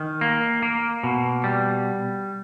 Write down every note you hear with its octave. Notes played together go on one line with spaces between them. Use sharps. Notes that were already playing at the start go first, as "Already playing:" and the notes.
Already playing: D#3
A#3
A#3
B2
G3